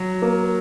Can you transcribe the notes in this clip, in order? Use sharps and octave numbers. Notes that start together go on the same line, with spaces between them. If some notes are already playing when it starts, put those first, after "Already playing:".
Already playing: F#3
A#3